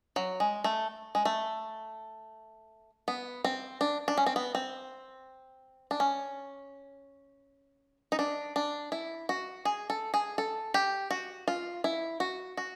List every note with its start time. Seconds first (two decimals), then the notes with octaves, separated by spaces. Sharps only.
0.16 F#3
0.40 G#3
0.64 A3
1.15 G#3
1.25 A3
3.08 B3
3.45 C4
3.81 D4
4.08 D4
4.18 C#4
4.26 C4
4.36 B3
4.55 C4
5.91 D4
6.00 C#4
8.12 D#4
8.19 D4
8.56 D4
8.92 E4
9.29 F#4
9.65 G#4
9.90 A4
10.14 G#4
10.38 A4
10.74 G4
11.11 F#4
11.48 F4
11.84 E4
12.20 F#4
12.57 F#4